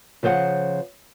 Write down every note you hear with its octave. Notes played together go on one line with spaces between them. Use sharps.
C#3 F3 C5 C#5 F#5